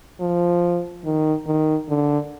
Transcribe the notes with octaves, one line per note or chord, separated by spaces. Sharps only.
F3
D#3
D#3
D3